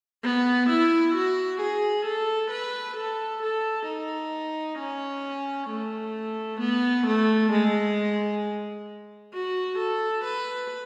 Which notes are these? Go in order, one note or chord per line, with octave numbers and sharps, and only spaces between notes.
B3
E4
F#4
G#4
A4
B4
A4
A4
D#4
C#4
A3
B3
A3
G#3
F#4
A4
B4